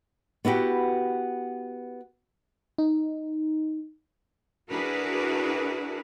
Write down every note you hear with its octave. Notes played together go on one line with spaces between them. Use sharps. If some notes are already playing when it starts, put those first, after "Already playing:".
B3 E4 F#4 G4
D#4
D4 E4 F#4 G#4 A#4 B4